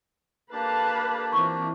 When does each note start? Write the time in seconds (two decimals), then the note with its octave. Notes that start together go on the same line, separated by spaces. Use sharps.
0.53 A#3 D4 G4 A4 B4 F5 A5
1.33 E3 C4 F4 C#6